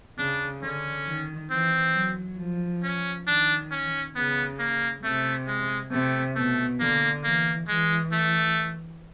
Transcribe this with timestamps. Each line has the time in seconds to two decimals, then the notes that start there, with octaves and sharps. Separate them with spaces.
0.18 C#3 D4
0.62 D3 C#4
1.06 D#3
1.51 E3 C4
1.95 F#3
2.39 F3
2.83 C#4
3.27 D#3 D4
3.71 C#4
4.15 C#3 B3
4.59 A#3
5.03 C3 A3
5.47 G#3
5.91 C3 A3
6.35 B2 A3
6.80 D3 A#3
7.24 E3 A#3
7.67 E3 G#3
8.12 A3